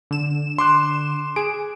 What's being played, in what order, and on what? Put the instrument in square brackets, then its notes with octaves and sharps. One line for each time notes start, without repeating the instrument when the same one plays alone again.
[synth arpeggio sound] D3 E7
[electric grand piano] C6 D6 F#6
[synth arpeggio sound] G#4 [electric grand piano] D7